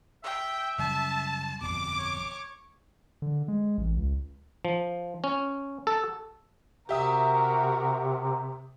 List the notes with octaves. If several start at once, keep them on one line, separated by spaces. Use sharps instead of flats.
E5 G5
F#2 C#3 G3 A5
G1 F2 B2 D6
C#5
D3
G#3
A1
C#2
F3
C#4
A4
C3 F#4 G4 A#4 E5 D#6